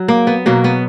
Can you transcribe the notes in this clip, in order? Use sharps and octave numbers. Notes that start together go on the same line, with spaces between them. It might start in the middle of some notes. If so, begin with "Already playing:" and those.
Already playing: F#3
A#3
B3
B2 F#3 A#3
B3